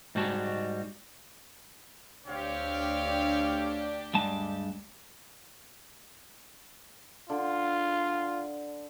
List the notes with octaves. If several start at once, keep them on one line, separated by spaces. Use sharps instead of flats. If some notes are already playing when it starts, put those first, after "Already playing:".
G#2 G3 G#3 F#4 A5
D2 C4 D4 G4 C#5 F5
G2 G#3 A5
D3 F4